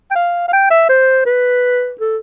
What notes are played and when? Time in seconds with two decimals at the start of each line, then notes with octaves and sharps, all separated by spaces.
0.11 G5
0.15 F5
0.48 F5
0.53 G5
0.71 E5
0.89 C5
1.26 B4
2.01 A4